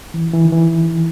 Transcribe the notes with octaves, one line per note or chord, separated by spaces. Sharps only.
E3
E3
D#3
E3